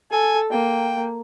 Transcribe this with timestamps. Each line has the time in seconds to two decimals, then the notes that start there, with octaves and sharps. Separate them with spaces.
0.12 A4 G#5
0.51 A#3 G5